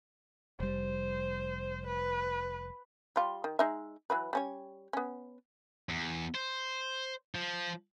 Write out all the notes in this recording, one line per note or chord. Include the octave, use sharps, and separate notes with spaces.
F1 G3 C5
B4
G3 F4
D#3
G#3 D#4 E5
E3 F#3 B4
G3 C#4 C#5
B3 C#4
E2
C5
F3